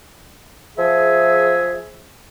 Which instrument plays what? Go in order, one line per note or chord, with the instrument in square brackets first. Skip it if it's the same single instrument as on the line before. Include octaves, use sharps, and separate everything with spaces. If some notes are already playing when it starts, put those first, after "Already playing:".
[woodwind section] F3 G#4 E5